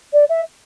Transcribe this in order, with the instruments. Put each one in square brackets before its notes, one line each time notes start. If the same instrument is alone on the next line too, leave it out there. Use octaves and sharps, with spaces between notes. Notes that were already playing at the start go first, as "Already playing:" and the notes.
[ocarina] D5
E5